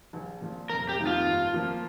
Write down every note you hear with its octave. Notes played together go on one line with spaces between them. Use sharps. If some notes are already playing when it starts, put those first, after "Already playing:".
A#1
A#2 F3
F1 A#4
G4
F2 D#3 A#3
F4
G2
F3 A#3